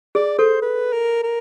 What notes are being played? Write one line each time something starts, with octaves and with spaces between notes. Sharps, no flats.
G#4 D5
A4 C5
B4
A#4
A#4